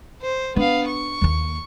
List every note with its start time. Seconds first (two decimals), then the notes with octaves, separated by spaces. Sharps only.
0.21 C5
0.56 B3 D4 F5
0.88 C#6
1.21 D#2 A#3